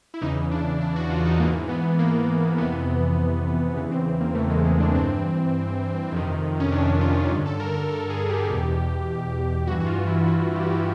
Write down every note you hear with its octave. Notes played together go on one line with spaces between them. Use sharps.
E4
E2 C#3 E3 D#4
D4
D4
F#4
F4
D#4
G#2 E3 A#3
B3
A#3
F2 C3 E3 B3
E2 C#3 E3 B3
C4
A#3
A3
G#3
G#3
D4
G2 E3 C4
F2 C3 D#3
C#4
D4
F4
G2 D3
A4
A#4
A#4
A4
G#4
G4
E2 B2
G2 E3 F#4
F#4
F4
E4
F#4
G4
F#4
G4